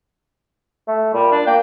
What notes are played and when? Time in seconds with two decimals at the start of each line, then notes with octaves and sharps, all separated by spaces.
0.88 A3
1.14 A#2 G3
1.32 D4
1.47 A#3 G5